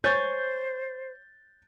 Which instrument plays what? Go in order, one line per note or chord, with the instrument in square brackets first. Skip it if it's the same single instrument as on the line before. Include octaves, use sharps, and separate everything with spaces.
[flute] C5 [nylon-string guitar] C#5 [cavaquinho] G#5 C#6 [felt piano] G6 A6